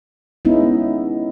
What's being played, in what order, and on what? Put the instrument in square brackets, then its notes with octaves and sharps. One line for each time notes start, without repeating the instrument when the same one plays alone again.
[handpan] G#3 B3 C#4 D#4 E4